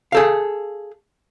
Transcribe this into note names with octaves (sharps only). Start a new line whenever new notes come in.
G#4 A4 F5